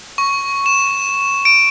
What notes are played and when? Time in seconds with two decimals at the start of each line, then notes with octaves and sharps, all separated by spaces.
0.18 C#6
0.66 E7
1.45 D7